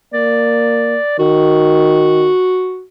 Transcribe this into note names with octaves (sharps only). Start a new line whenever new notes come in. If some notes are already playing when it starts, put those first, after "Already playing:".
A#3 D5
D#3 F#4